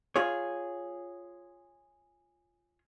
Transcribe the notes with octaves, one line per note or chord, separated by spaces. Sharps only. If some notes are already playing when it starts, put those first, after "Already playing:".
F4 G#4 C#5